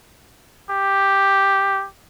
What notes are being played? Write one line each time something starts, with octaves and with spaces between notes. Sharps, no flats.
G4